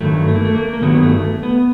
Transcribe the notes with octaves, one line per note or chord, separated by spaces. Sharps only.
G2 D#3 F#3 A3
A3
A#3
A3
A#3
A#3
G2 D#3 F#3 B3
A3
B3